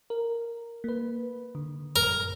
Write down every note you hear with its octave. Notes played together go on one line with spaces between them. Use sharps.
A#4
A#3 B4
D3
F#2 A#4